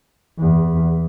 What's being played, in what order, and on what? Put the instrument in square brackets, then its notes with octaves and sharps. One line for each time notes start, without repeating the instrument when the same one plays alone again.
[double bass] E2